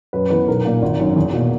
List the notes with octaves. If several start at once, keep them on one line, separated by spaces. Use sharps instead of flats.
F#2 B4
E3 B3 B4
B1 A#4
A#2 A#3
G#1
F#2 D#3
E2
B2 A#3